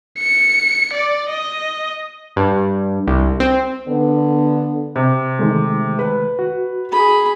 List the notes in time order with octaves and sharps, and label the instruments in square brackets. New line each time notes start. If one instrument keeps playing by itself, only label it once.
[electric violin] C#7
D5
D#5
[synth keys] G2
C2
C4
[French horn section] D3 B3
[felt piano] C3
[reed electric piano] D#3 G#3 A3
[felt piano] B4
[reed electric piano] F#4
[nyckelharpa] G#4 B5